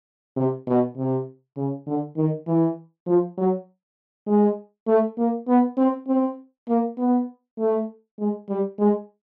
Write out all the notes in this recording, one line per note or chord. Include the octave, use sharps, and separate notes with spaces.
C3
B2
C3
C#3
D3
D#3
E3
F3
F#3
G#3
A3
A#3
B3
C4
C4
A#3
B3
A3
G#3
G3
G#3